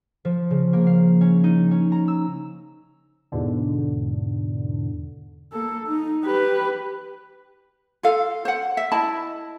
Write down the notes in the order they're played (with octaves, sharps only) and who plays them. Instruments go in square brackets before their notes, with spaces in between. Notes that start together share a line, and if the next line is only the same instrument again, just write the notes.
[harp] F3
C#3
A#3
F5
C#4
D#4
C#4
A#5
E6
[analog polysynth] E2 G#2 B2 D3
[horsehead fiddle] A#3 A4
D#4
G4 B4
[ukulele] F4 A4 F5
C5 F#5
E5
E4 D#5 A5 B5